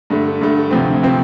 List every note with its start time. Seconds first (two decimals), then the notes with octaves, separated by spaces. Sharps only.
0.10 G2 D3 A3
0.41 G2 D3 A3
0.71 D2 C3 F3 C4
1.03 C3 F3 C4